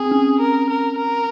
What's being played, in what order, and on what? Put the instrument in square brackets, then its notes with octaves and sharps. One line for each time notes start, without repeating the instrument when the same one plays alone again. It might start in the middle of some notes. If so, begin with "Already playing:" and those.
Already playing: [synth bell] C4 [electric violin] G#4
[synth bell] C#4
[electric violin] A#4
A#4
A#4